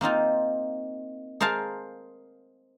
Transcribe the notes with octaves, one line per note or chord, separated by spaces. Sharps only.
A#3 C4 D#4 F4
G#4 A#4 C5 F5 A5